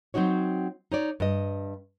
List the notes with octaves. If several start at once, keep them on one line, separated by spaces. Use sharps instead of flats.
F#3 C4 D#4 F#4 C#5
D#4 C#5 D5
G2 D#5